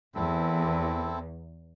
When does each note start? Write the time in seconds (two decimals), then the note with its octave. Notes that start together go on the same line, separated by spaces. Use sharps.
0.15 E2 C4 E4 A4